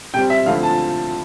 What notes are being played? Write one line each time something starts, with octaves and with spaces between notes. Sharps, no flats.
C3 G3 C4 G5
E5
D2 D3 F3 C4 E4 F5
A5